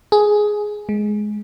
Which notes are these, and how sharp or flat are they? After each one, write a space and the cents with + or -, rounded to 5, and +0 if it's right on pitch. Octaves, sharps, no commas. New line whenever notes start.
G#4 +10
G#3 +15